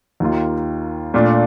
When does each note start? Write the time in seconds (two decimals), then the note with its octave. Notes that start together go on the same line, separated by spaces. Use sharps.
0.20 D#2 D#3 A#3 F4
1.14 A#2 A3 D4 F4